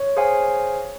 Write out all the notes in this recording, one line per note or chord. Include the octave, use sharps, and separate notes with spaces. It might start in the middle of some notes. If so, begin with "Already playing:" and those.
Already playing: C#5
G#4 C5 F5 G#5